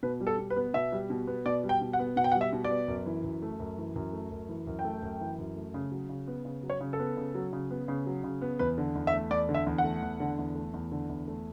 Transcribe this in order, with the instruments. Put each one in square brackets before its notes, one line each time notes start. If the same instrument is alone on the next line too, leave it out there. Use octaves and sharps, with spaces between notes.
[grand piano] B2 B4
G3
A4
B2
B4
B3
B2 E5
G3
B2
B3
B2 D5
G3
G5
B2
F#5
B3
B2 F#5
G5
F#5
G3
E5
B2
D5
B3
F#2
E3
F#2
A3
F#2
E3
F#2
A3
F#2
E3
F#2
G5
A3
F#2
E3
F#2
A3
C#3
F#3
C#3
B3
C#3
F#3
C#5
C#3
A4
B3
C#3
F#3
C#3
B3
C#3
F#3
C#3
B3
E2 B4
D3
E2
E5
A3
E2 D5
D3
E5
E2
F#5
A3
E2
D3
E2
A3
E2
D3
E2
A3